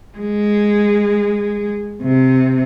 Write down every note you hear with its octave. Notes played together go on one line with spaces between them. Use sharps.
G#3
C3